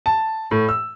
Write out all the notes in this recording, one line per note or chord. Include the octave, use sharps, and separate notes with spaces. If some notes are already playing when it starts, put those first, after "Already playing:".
A5
A2
E6